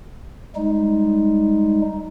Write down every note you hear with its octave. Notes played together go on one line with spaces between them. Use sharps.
G3 G#3 D#4